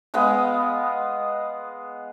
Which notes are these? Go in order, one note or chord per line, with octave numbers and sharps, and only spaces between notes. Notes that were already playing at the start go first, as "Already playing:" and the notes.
G#3 B3 D#5 F5